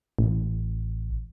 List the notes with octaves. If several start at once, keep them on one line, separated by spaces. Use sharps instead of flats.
A1